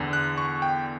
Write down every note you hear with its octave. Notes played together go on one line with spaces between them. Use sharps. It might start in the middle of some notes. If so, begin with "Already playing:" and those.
Already playing: E2 D3
F#6
C#6
G5